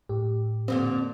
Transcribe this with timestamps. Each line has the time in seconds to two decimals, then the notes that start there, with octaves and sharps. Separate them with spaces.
0.09 A2 G4
0.68 F2 A#2 D3 C4